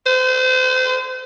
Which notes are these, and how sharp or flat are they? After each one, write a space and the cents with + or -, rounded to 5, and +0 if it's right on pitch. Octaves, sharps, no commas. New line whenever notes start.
C5 -35